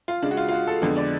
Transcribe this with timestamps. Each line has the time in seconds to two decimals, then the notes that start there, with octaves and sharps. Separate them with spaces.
0.08 F4
0.22 C#3 G#3 D4
0.31 F#4
0.37 F4
0.48 F4
0.53 F#4
0.67 A4
0.82 F2 D3 G#3 B3 D4
0.97 D5